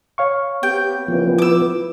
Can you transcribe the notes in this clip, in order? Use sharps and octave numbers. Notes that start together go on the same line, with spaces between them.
C#5 F5 C#6
B3 C4 G4 G5
A#2 C#3 E3 F3 B3
E4 B4 D6 E6